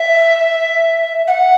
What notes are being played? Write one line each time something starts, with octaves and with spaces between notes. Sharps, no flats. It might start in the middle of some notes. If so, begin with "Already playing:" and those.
Already playing: E5
F#5